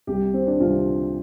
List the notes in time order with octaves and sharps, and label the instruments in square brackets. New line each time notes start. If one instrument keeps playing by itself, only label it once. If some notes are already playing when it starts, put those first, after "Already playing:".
[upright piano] C2 C3 G3 G4
C4
D4
C2 C3 G3 F4